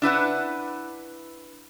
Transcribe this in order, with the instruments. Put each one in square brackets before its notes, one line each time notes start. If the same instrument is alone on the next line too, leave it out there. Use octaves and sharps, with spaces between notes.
[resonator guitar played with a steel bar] D4 E4 B4 F#5